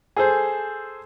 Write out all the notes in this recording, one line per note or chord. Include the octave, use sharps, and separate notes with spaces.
G#4 A4 C5